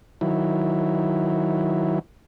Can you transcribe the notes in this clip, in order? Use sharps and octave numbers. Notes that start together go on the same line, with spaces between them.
D#3 F#3 E4